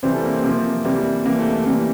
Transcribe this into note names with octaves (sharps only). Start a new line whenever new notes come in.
C3 E3 G3 C5
A4
A#3
C4
C3 F3 A#3
C3 E3 G3 A#3
C3 E3 G3 A#3
A3
A3
C3 E3 G3 A#3